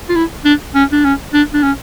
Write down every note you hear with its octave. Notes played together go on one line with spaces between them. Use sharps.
F4
E4
D4
C#4
D4
C#4
D4
D4
C#4